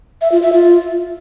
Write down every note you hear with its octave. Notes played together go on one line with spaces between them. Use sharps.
E5
F4
E5
F4